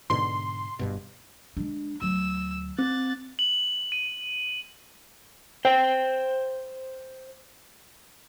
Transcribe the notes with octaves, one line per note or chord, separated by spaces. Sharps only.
G#2 B2 D3 C6
G1 G2 B2
G#3 D4
D2 F#3 E6
C4 F#6 A6
F#7
D#7
C5 G5